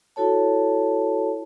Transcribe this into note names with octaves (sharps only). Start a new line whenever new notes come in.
E4 F#4 A4 C#5 A5